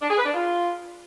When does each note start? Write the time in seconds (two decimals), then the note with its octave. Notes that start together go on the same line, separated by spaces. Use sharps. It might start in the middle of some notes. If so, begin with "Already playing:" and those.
0.01 D4
0.09 G#4
0.17 B4
0.25 D4
0.34 F4